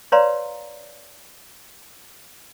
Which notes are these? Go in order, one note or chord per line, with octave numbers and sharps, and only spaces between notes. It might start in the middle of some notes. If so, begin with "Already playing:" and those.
B4 C#5 D5 F5 A#5 C6